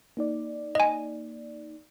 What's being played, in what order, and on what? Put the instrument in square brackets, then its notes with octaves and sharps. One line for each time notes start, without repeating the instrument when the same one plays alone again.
[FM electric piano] A#3 D#4 D5
[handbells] D#5 G#5